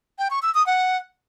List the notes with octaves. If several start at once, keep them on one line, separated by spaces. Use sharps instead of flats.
G5
C#6
E6
D#6
F#5